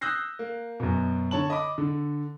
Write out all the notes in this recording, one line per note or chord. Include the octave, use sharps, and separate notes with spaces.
D#6 E6 F#6 G6 A#6 C7
A#3
F#2 B2
D3 C#5 A5 F#7
D#5 B5 D6
D3